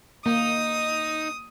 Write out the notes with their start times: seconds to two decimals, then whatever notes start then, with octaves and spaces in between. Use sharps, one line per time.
0.26 A#3 D#4 D#6